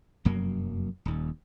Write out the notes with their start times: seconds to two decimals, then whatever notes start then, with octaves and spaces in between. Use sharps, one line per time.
0.25 F1 F#2 F#3 A#3
1.05 D#1 D#2